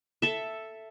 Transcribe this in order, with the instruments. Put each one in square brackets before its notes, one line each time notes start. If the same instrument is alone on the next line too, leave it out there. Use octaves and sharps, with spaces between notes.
[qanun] A4 E5